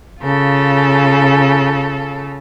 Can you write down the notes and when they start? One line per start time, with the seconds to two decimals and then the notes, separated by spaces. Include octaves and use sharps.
0.22 C#3 F4 A4